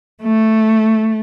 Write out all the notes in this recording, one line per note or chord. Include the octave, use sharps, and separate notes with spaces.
A3